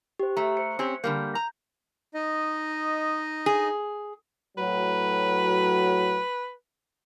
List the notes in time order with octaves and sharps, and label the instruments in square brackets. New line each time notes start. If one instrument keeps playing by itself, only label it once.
[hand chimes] G4 C5
[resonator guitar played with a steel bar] A3 [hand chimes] A#5
[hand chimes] C5 C#7
[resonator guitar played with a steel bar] C4 C#4 G4
[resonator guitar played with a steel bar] D3 G3 A#3 [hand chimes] G6
[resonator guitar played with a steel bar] A#5
[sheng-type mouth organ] D#4 D#5
[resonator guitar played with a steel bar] G#4
[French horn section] A2 F#3 [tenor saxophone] B4